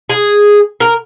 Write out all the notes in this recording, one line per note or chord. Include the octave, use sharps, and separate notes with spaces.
G#4
A#4